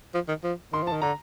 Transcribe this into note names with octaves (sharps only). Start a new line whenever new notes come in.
F3
D#3
F3
D#3 C6
F3 A5
D#3
D3 A#5